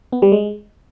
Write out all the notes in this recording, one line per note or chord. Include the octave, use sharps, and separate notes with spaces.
B3
G3
G#3